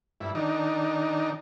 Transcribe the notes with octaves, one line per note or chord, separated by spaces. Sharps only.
G2 E4
D#3 D4 D#4